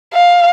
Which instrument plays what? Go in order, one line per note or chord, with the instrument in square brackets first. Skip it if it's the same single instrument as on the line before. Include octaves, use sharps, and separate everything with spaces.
[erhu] F5